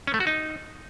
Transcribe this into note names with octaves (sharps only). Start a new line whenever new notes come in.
C#4
A3
F#4
D#4